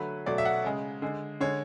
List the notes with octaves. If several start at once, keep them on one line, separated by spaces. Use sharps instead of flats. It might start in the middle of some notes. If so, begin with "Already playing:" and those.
Already playing: D3 F#3 A3 B4
B2 F#3 A3 D5
E5
F#5
C#3 G#3
D3 G#3
D3 G#3 C#5